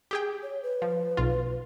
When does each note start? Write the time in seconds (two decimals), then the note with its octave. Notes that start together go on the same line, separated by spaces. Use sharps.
0.11 G4 G#4 G5
0.43 C#5
0.63 B4
0.82 F3
1.17 B1 F4